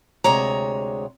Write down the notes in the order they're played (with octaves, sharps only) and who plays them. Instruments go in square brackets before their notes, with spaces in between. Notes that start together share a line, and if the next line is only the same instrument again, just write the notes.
[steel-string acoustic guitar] D2 C3 G#3 C#5 A#5